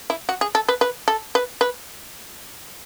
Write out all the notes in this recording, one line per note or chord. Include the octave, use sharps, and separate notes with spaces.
E4
F#4
G#4
A4
B4
B4
A4
B4
B4